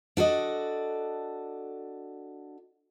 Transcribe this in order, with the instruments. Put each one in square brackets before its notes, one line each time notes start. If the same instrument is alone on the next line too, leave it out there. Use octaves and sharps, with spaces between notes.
[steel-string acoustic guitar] D4 F#4 A4 D#5